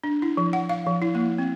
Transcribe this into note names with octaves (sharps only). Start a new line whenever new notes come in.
D4
E4
F3
F#5
F5
F3
E4
A#3
C4